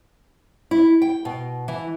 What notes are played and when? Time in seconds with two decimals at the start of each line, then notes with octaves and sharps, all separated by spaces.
0.71 E4
1.02 G5
1.25 B2
1.68 E3